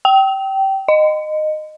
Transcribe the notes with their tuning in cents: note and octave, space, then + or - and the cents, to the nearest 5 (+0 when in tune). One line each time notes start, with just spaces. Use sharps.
G5 -20
D#5 -15